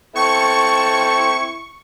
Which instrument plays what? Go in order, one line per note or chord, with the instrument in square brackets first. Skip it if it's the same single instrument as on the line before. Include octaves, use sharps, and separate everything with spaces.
[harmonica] C4 E4 A4 [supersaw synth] C#6